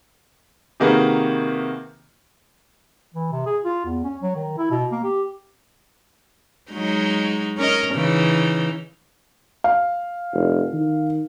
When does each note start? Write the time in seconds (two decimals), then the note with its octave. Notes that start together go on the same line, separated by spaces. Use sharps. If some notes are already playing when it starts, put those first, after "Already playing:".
0.80 C3 D#3 A#3 F#4 G#4 B4
3.14 E3
3.32 C3
3.46 G#4
3.64 F4
3.85 E2
4.04 C#4
4.22 F#3
4.36 D#3
4.58 E4
4.71 B2
4.92 A#3
5.04 G4
6.71 F#3 G#3 D#4
7.58 C#4 A#4 D#5
7.94 C#3 E3 D#4
9.64 F5
10.34 F1
10.73 D#3